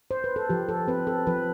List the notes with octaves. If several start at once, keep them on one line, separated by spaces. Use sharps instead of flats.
C5
B4
A4
F3 G4
A4
C4 B4
A4
F3 B4